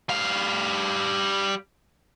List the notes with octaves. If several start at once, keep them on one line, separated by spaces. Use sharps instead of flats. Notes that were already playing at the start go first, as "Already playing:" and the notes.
G3 F5